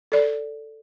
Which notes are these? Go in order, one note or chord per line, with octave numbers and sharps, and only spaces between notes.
A4 D5